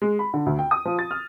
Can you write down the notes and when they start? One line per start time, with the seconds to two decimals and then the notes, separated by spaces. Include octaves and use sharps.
0.02 G#3
0.19 B5
0.34 D3
0.46 D2
0.59 G5
0.71 D#6
0.85 F3
0.99 A6
1.11 F6